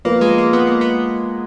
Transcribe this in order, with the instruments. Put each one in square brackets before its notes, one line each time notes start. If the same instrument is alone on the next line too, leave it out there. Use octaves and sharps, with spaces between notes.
[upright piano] F3 B3 F4 B4 [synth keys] A#3
[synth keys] G#3
A#3
B3
A#3
B3